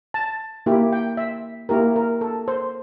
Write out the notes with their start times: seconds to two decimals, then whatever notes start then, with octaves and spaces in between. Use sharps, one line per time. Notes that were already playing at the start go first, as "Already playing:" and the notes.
0.14 A5
0.66 A#3 E4 G4
0.93 G5
1.17 E5
1.69 A#3 E4 G4 A#4
1.96 A#4
2.21 A4
2.48 C5